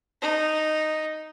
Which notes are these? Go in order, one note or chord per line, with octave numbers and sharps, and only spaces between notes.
D#4